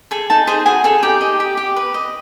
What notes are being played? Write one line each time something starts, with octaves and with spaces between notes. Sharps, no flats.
G#4 A4 G#5
D#4 A4 A5
G#4 C5 G#5
F#4 G#4 G#5
G#4 A4 G#5
D#4 G4 G5
D#5
G4
G4
B4
D#5